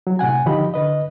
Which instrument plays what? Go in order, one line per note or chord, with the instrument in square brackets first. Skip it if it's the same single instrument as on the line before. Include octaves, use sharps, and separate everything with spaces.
[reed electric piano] F#3
A2 C3 F#5 G#5
D3 D#3 F3 G4 D#5 B5
D3 B4 D#5